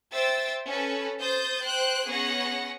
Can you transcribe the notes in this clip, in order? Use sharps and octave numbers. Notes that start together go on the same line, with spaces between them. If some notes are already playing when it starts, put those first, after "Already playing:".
C5 E5 G5 E6 A6
C#4 A4 B4
C5 D#6 G6 A6
C5 G5 F#6 G6
B3 C#4 G#4 F#5 C#6 A#6